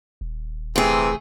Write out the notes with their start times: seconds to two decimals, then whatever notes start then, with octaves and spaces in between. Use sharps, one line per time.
0.21 D#1
0.76 C3 E3 A3 G#4